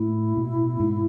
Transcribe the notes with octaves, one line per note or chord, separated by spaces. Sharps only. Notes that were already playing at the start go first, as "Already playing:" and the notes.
Already playing: A2 E4
B2
G#2